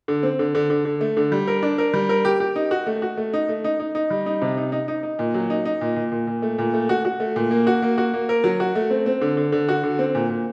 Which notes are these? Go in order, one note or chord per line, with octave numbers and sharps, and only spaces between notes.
D3
C4
D3
D3
D3
D3
A3
D3
G3
A#4
D4
A#4
G3
A#4
G4
G4
D#4
F#4
A3
F#4
A3
D#4
A3
D#4
D#4
D#4
G3
D#4
C3
D#4
D#4
D#4
D#4
A#2
F#3
D#4
D#4
A#2
A#2
A#2
A#2
A3
A#2
A3
F#4
F#4
A3
A#2
A#3
F#4
A#3
F#4
A#3
A#4
F#3
F#4
A3
C4
C4
D3
D3
D3
F#4
D3
C4
A#2
A#2